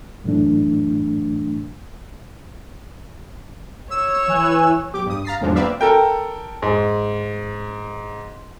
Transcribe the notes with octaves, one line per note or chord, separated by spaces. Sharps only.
F#2 A2 E3 A3 D4
C#5 E6
E3 G#5 F#6
B1 G4 D6
G2 D#6
F5 A#5 A6 B6 C7
E2 G#2 D3 F3 F#3 D4
A#3 C4 B4 D5 E5 F5
A4 A#4 G5
G#2